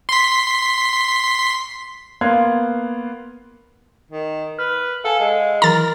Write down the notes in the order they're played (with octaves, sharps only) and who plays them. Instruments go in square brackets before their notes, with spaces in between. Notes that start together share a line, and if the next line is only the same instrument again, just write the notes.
[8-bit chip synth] C6 B6
[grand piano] A#3 B3 F5 C6 F#6 G#6
[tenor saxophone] D#3
[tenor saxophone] B4 [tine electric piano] F6
[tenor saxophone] A4 [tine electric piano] F5 F#5 G#5
[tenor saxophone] G#3
[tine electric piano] D#3 E3 F#3 [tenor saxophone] A#4 [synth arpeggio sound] A#5 A6